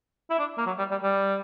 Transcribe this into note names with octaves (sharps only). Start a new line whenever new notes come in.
E4
D4
A#3
F#3
G3
G3
G3